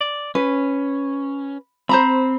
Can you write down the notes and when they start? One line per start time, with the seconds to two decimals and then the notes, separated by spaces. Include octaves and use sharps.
0.01 D5
0.35 C#4 B4
1.89 C4 C5 A#5 B5